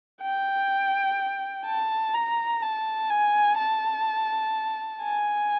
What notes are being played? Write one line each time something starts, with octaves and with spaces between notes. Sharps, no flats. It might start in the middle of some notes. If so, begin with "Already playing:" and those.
G5
A5
A#5
A5
G#5
A5
G#5